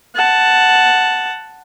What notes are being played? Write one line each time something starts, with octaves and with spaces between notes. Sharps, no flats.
F#5 A5